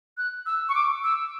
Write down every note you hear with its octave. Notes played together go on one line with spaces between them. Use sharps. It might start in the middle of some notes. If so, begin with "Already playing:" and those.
F#6
E6
C#6
D6
E6